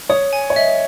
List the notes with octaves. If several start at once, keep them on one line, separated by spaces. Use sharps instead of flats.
C#5 D#6
G#5
C#5
D#5 E5